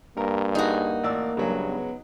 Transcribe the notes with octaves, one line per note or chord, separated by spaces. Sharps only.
G2 A#3 A#4
D#4 F#4 G#4
A1 D5 E6
G2 C#3 F#3 G#3
B3